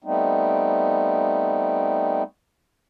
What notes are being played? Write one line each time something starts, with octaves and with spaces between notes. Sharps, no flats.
G3 A3 B3 C4 D#4